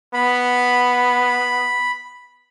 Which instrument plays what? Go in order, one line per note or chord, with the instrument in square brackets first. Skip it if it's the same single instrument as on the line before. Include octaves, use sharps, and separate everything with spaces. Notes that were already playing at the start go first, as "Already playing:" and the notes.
[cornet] B3 [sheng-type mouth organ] B5